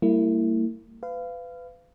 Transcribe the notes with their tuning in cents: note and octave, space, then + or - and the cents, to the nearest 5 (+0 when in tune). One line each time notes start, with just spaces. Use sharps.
G3 -5 A#3 -40 E4 +0
B4 +30 F5 -15